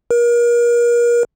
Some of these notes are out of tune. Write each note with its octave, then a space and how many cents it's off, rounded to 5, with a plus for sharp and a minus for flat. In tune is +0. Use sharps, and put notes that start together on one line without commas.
A#4 +35